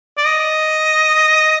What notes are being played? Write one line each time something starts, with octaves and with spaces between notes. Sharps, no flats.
D5
D#5